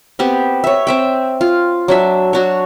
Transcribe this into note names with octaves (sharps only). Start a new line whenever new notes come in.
B3 C4 G4
C#5 E5
C4 E5 G5
F4
F#3 D4 E5
D4 F#4 C#5